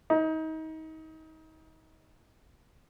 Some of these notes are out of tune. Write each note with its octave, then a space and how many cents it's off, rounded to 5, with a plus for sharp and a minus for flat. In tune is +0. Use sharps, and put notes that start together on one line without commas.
D#4 +30